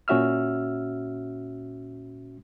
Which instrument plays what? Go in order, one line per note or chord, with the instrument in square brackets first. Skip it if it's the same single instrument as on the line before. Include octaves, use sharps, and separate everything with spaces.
[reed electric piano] A#2 C#4 F#4 E5 E6 F6